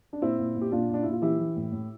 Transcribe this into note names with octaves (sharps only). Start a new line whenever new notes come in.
D4
A#2 C4 E4
A#2
A#2
G4
A#2 D4 F4
A#2 D4
A#2 E4
F4
E3 E4 G4
E3
A2
A2